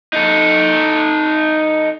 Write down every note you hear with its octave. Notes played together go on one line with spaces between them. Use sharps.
D#4 A4